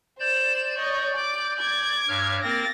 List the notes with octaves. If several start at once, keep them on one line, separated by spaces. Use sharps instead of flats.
C5 D5 G6 E7
C#5 D#5
D6
D6 G#6
G2 C#5 F6
A#3 C4 A#4 A6 A#6